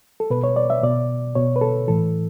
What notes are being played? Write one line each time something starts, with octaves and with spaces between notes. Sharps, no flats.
A4
B2 B4
C#5
D5
E5
B2 D5
B2 C#5
B4
A4
A2 E3 A4